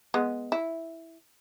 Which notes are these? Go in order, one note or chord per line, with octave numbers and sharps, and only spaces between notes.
G#3 B3
E4